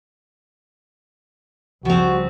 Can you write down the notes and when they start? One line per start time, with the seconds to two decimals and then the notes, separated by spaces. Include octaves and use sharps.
1.85 C#2 F3 G3 C4 F#4